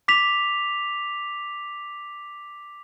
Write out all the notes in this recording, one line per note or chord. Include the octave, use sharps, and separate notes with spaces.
D6 B6 F7